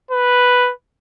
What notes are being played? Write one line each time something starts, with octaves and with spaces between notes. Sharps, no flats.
B4